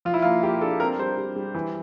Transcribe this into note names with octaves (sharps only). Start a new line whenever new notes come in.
F3 F4
E4
F4
A#3
A#3 G4
D4 A4
C4 A#4
G3 C5
G3
G3
E3